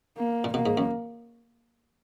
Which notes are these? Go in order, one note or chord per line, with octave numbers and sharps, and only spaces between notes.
A#3
A#2
B2 A#3
G#2
F#2